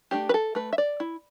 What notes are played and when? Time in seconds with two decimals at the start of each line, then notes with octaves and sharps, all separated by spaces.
0.11 A3 D4 G4
0.29 B4
0.34 A4
0.55 A3 B4
0.73 E5
0.78 D5
1.00 E4